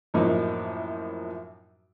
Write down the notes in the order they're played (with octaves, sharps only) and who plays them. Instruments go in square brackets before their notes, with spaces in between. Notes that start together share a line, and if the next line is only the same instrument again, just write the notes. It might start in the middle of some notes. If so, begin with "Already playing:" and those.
[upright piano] F#2 A2 F3 A#3 D#4 F#4